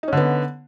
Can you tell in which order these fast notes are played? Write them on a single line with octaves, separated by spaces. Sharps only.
D#4 C#4 D3 B3